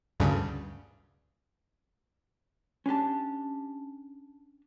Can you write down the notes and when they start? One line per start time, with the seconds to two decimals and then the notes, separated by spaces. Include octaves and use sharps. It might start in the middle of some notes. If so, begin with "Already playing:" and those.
0.20 D2 G2 C#3
2.86 C#4 D4 G4 A5